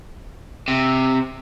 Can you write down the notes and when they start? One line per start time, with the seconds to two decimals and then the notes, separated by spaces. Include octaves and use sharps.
0.68 C3